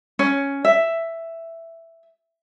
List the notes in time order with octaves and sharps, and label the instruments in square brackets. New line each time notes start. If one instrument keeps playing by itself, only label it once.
[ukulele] C#4
E5